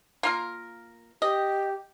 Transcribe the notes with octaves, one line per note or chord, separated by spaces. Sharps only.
A#3 F4 A#4
G4 D#5